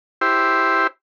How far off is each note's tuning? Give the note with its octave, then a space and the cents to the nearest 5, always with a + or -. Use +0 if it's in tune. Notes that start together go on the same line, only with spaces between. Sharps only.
E4 +0 G4 +0 C5 +0